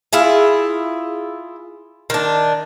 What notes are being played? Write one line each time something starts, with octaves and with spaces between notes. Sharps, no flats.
E4 F4 G#4
D#3 D4